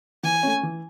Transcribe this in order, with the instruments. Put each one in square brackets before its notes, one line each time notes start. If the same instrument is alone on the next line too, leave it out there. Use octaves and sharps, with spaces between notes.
[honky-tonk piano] E3 [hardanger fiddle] G#5
[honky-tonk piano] A3 C#4
E3